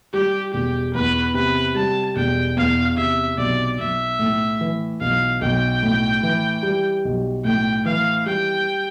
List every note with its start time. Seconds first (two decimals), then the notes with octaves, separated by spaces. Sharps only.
0.13 G3 G4
0.53 E1 G4
0.94 E2 B4
1.34 C3 B4
1.75 G3 A5
2.16 E1 G5
2.57 E2 F5
2.97 C3 E5
3.38 B1 D5
3.79 B1 E5
4.19 A2
4.61 E3
5.01 B1 F5
5.41 B1 G5
5.83 A2
6.23 E3
6.63 G3
7.05 B1
7.45 A2 G5
7.85 E3 F5
8.26 G3 G5